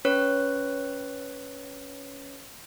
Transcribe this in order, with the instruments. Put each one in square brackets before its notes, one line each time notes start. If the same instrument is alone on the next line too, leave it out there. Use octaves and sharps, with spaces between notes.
[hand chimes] C#4 B4 C#5 F#6